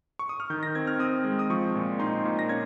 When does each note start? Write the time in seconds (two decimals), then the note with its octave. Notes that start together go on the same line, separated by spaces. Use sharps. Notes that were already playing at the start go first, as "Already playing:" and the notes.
0.19 C#6
0.29 D#6
0.40 F6
0.50 D#3 G6
0.63 A#6
0.75 C4 G#6
0.87 F6
0.99 C4 D#6
1.25 G#3
1.39 D#6
1.50 F3 C#6
1.75 A#2
1.99 D#4 C6
2.25 A#2
2.39 A#6
2.49 C#4 G#6